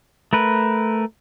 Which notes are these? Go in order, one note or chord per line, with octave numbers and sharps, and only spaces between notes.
A3 A#4 B4